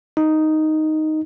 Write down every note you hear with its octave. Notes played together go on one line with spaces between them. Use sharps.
D#4